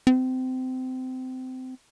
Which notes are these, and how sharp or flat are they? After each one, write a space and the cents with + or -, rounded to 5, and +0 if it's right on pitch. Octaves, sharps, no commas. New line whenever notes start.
C4 -25